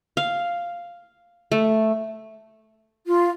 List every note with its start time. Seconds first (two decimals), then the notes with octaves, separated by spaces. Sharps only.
0.17 F5
1.52 A3
3.06 F4